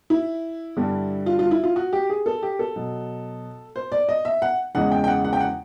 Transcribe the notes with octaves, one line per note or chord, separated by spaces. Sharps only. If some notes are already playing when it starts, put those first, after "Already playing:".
E4
G2 D3 G3
F4
F4
E4
F4
F#4
G4
G#4
A4
G4
A4
B2 F#3
C5
D5
D#5
E5
F#5
E2 C#3 E3 G#3 F#5
G5
G5
F#5
F#5
G5
F#5